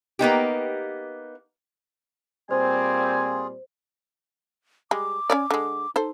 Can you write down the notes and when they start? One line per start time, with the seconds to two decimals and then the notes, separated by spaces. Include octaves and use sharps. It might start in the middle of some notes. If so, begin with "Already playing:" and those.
0.19 A#3 B3 D#4 G4
2.51 A#2 G3 C4 F4 G#4 C5 G#5
4.91 G3 G#3 D6
5.30 C#4 C#5 D5
5.51 D3 G#3
5.96 D#4 A4 C5